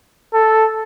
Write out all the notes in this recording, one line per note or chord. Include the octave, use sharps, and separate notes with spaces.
A4